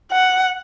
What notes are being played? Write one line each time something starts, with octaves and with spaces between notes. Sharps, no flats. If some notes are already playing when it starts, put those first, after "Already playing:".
F#5